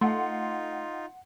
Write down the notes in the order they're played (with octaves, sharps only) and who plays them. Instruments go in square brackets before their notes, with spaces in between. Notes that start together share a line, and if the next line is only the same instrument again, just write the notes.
[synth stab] A3 [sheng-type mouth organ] D#4 F4 [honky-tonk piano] F#5 C6